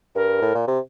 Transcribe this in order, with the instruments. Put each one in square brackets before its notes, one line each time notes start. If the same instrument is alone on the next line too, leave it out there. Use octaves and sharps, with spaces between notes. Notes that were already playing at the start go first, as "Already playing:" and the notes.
[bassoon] G2 [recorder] A#4
[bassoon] A2
A#2
C3